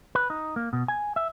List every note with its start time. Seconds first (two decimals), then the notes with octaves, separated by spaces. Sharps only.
0.15 B4
0.30 D#4
0.56 A#3
0.73 B2
0.88 G#5
1.16 E5